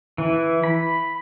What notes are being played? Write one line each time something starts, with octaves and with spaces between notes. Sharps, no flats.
E3
B5